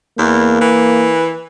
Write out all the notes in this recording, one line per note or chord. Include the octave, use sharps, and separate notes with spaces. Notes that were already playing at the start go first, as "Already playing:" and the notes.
E2 A#3
E3